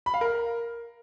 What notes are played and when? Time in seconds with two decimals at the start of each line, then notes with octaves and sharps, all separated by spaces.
0.06 B5
0.14 F5
0.21 A#4